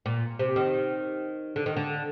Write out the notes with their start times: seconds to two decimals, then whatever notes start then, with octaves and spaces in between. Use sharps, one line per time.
0.06 A#2
0.39 C3
0.56 D#3
1.56 D3
1.66 D#3
1.76 D3